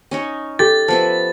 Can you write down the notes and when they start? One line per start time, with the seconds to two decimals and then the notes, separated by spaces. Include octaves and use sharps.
0.11 C#4 D#4 C#5
0.59 G4 A4 A6
0.88 F3 B3 E5 A5